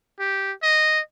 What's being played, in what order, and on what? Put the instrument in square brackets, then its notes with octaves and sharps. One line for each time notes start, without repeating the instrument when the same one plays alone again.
[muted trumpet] G4
D#5